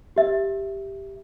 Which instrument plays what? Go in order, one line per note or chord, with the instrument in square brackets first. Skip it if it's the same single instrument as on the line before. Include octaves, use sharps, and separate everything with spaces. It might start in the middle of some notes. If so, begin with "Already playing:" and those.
[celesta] G4 E5